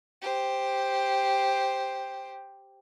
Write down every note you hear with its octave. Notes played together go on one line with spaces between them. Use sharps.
G4 C5